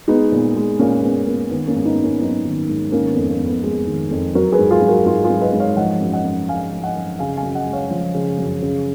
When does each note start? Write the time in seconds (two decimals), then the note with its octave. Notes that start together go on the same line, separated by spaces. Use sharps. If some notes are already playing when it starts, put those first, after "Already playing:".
0.08 G#3 B3 D#4
0.32 A#2
0.56 G#3
0.79 A#2 A#3 C#4
1.02 G#3 B3
1.27 A#2 A#3
1.50 D#3 B3
1.68 A#3 C#4
1.74 G#2
1.85 B3 D#4
1.98 G#2
2.04 A#3 C#4
2.21 F#3 B3 D#4
2.45 D#3
2.69 G#2
2.92 D#3 A#3 C#4
3.11 F2 B3
3.28 A#3
3.40 F2
3.46 B3
3.64 G#3
3.87 D#3
4.11 F2
4.35 F#3 F#4 A#4
4.52 G#4 B4
4.59 G#2
4.71 F4 G#4
4.82 F#3
4.88 F#4 A#4
5.06 G#2 F4 G#4
5.24 F4 G#4
5.30 F#3
5.41 B4 D#5
5.53 G#2
5.60 C#5 F5
5.77 F3 D#5 F#5
6.01 F#2
6.13 D#5 F#5
6.25 F#2
6.48 G#3 F5 G#5
6.72 F3
6.83 D#5 F#5
6.96 F#2
7.19 C#3 F5 G#5
7.37 F5 G#5
7.43 F#2
7.55 D#5 F#5
7.66 G#3
7.73 C#5 F5
7.91 F3
8.14 C#3
8.39 F#2
8.62 C#3